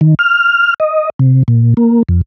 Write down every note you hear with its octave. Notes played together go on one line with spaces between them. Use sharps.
D#3
F6
D#5
C3
A#2
A#3
F2